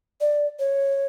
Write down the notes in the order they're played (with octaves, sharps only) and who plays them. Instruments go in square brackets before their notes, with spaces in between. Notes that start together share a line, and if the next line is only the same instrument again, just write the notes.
[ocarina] D5
C#5